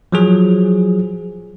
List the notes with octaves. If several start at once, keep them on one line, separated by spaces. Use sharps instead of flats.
F3 F#3 G#4